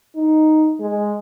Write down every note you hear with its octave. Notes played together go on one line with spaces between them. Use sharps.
D#4
G#3